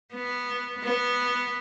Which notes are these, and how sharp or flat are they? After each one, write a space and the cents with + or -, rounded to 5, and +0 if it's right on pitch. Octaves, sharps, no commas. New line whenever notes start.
B3 -5
B3 -5